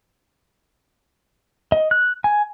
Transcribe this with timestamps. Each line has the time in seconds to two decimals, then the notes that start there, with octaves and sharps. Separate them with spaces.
1.72 D#5
1.91 F#6
2.24 G#5